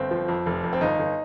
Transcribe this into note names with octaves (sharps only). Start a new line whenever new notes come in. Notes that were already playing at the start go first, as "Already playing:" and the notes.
Already playing: G1 C4
F3
F2
F1
F2
C4
G1 D#4
G1